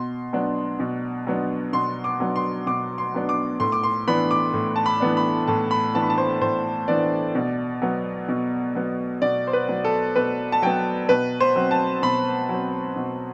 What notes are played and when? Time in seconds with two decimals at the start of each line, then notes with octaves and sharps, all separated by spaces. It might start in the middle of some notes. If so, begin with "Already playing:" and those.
Already playing: B2 C6
0.33 F#3 B3 D4
0.80 B2
1.27 F#3 B3 D4
1.73 B2 C6
2.04 D6
2.20 F#3 B3 D4
2.36 C6
2.67 B2 D6
2.98 C6
3.14 F#3 B3 D4
3.29 D6
3.60 A2 C6
3.72 D6
3.83 C6
4.07 E3 B3 D4 B5
4.31 D6
4.54 A2
4.76 A5
4.86 B5
5.00 E3 B3 D4
5.17 B5
5.47 A2 A5
5.71 B5
5.94 E3 B3 D4 A5
6.03 B5
6.10 A5
6.18 C5
6.41 A2 C5
6.88 E3 B3 D4 D5
7.35 B2
7.82 F#3 B3
8.29 B2
8.75 F#3 B3
9.22 B2 D5
9.47 C5
9.53 B4
9.69 F#3 B3
9.85 A4
10.16 B2 B4
10.52 A5
10.62 F#3 B3 G5
11.09 B2 B4
11.40 C5
11.55 F#3 C4
11.71 A5
12.02 B2 B5
12.49 F#3 C4
12.96 B2